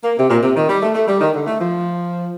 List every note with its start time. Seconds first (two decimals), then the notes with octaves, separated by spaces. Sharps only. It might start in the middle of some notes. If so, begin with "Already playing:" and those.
0.04 A#3
0.18 C3
0.30 A#2
0.43 C3
0.57 D#3
0.69 G3
0.83 A3
0.95 A3
1.08 G3
1.21 D#3
1.35 D3
1.47 A3
1.60 F3